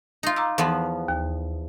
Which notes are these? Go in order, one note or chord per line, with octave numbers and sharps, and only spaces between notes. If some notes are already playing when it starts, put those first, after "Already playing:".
D#4 F4
A#5 D6 E6
E2 F3 B3
D#2